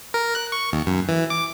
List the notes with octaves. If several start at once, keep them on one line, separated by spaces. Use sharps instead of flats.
A#4
F#6
C#6
D#2
F#2
E3
D6